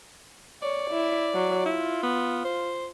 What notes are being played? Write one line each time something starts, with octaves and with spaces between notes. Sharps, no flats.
C#5 D5
E4
F#3
E4 F4
B3
C5